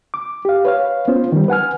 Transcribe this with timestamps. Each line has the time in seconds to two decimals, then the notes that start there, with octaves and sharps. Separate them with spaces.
0.14 D6
0.45 G4 F5
0.65 B4 C#5 F5
1.08 B3 C#4 F4 C5
1.32 D#3 G3
1.48 B4 F#5 G#5 F6